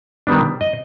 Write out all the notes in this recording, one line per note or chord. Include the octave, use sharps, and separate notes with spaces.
D#3 G3 B3 D4
D#5